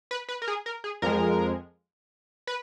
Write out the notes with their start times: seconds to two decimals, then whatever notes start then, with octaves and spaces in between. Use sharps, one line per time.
0.11 B4
0.29 B4
0.42 A#4
0.48 G#4
0.66 A#4
0.84 G#4
1.02 F2 F3 G#3 A#4
2.47 B4